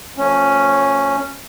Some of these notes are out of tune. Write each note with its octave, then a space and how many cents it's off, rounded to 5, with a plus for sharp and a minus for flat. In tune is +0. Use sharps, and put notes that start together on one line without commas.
F3 +20 A3 +45 C#4 +0